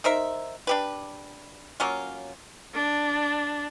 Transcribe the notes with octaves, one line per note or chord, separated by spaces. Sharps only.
D#4 A#4 C5 E5
D4 G4 B4
F#3 A#3 C#4 F4
D4